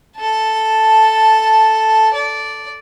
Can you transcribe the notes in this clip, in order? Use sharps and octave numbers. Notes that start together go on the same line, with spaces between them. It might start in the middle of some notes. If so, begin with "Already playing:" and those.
A4 A5
D5